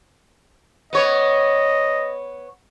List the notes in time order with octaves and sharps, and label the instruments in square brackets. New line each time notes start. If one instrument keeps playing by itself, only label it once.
[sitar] B3 C#5 [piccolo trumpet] D#5